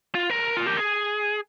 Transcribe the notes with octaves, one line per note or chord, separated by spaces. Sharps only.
F4
A#4
F4
G4
G#4